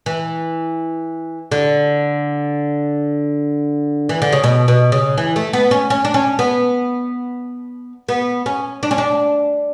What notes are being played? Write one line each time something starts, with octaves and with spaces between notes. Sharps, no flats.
E3
D3
E3
D3
C#3
B2
B2
C#3
E3
A3
B3
C#4
C#4
D4
C#4
B3
B3
C#4
D4
C#4
D4